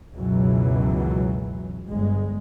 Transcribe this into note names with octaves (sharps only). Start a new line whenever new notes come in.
C#2 F#2 B2 E3 F#3
G1 G#3